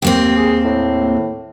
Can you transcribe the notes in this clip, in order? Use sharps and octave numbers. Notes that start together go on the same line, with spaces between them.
D#2 A#3 C4 G4
G#4
A2